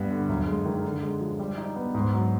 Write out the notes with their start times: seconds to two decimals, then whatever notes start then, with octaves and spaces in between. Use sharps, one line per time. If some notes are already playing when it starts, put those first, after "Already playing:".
Already playing: G2 G3 B3
0.11 D3
0.29 F#2
0.47 G#3
0.66 D#3
0.84 D3
1.03 G#3
1.21 F3
1.39 G3
1.58 D#4
1.76 B3
1.95 G#2
2.13 F#3